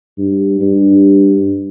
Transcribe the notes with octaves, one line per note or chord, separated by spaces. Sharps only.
G2
G2